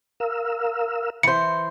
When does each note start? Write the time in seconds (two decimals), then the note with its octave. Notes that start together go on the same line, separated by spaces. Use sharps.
0.20 A#4 F5 E6
1.23 E3 C5 C#7